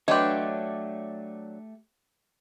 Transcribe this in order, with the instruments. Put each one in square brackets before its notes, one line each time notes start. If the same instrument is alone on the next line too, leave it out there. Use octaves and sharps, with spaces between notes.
[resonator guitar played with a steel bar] F#3 D4 [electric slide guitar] A3 [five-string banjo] G4 B4 C#5 [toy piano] D#5 C6